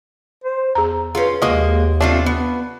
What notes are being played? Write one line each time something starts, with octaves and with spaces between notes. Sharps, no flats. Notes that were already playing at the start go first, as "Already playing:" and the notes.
C5
E2 G#4 A#5
C#4 F4 G#4 B4
D#2 G#3 A#3 F#4 D#5
A3 C4 D4 F4
B3